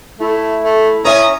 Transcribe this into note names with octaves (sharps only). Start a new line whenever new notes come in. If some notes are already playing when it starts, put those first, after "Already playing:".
A3 E4
A3
C#4 C#5 E5 G#5 A#5 D#6